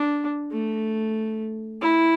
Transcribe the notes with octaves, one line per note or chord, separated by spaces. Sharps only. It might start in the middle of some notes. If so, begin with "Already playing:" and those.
Already playing: D4
A3
E4